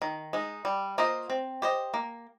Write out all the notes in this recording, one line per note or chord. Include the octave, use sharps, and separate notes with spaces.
D#3
G#3 D#4
G3
A#3 F4 C5 D#5
C4
G4 C5 D#5
A#3